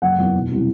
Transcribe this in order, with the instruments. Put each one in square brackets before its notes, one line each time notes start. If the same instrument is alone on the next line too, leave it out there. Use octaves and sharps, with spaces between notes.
[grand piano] F#1 F#5
E2 D#3 F#3
E1
C3 E3 G3